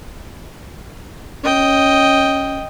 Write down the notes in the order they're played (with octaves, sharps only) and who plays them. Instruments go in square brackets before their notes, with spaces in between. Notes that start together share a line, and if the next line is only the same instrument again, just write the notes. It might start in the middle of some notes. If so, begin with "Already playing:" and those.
[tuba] C#4 [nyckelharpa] D#5 G5